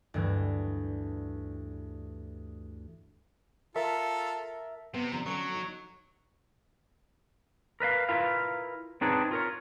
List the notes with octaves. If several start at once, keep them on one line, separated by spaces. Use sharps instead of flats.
D2 G2 E3
F4 A4 A#4 E5 A5
C3 B3
D3 F3 A#5
D3 F#3 C#4 C#6 C#7 D7
C#6
D#4
A#4 B4 D#5 F5
E4 F4 A#4 B4 F5
C4 D4 D#4 G#4 B4 C#5
F4 A#4 C#5